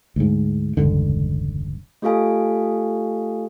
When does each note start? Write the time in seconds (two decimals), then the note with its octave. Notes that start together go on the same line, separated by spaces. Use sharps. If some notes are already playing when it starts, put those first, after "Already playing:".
0.16 D2 G#2
0.77 E1 C#2 G2 D3
2.02 A3 F4 G4 A4 F5 G#5